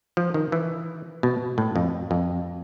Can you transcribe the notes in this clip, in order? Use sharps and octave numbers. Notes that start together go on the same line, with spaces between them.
F3
D#3
E3
B2
A2
F2
F2